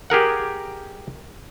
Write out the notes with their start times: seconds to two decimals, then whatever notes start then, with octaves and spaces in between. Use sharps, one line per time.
0.10 G4 G#4 A#4 F#5